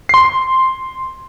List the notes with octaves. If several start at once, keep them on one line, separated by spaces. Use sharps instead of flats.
C6 C7